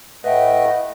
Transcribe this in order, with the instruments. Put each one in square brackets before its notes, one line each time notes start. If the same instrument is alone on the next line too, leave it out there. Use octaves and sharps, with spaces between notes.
[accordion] A2 A3 [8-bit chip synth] B4 E5 G5 [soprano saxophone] D#5 [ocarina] F#5